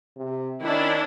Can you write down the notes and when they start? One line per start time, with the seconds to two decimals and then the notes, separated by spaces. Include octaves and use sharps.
0.16 C3
0.61 D#3 C#4 D4 E4